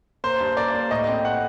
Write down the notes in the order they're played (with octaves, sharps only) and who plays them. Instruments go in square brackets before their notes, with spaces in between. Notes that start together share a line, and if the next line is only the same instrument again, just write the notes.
[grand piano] A#3 C5
G2
A#3 D5
A#3
A2 D#5
C4
A2 F#5